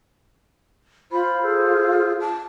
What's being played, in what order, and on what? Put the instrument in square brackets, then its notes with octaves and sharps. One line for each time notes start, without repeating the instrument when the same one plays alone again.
[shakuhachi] F4 [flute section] C5 B5
[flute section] G#4 A4 C5
[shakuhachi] A5